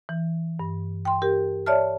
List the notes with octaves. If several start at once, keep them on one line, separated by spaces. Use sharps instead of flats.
E3
G2
G5 C6
G4 A#4
C#5 D5 E5 A5 F6